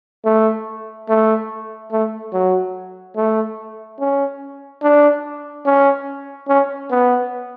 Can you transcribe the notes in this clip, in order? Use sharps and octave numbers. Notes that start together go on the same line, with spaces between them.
A3
A3
A3
F#3
A3
C#4
D4
C#4
C#4
B3